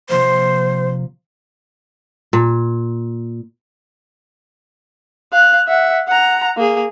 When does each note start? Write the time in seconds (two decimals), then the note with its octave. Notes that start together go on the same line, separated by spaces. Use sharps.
0.09 C3 F3 A#3 C5
2.33 A#2
5.32 F5 F#6
5.68 E5 F#5
6.07 F#5 A#5
6.57 A#3 G#4